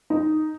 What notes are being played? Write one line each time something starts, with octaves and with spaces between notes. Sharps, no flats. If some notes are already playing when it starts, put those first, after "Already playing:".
D#4